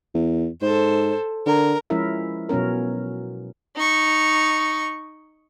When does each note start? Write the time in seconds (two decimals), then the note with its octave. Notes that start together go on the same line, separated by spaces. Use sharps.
0.15 E2
0.62 G#2 A4 C5
1.46 D3 A#4
1.90 F3 G#3 C#4 E4 A#4 E5
2.49 B2 F#3 B3 C#4 A#4
3.76 D#4 C#6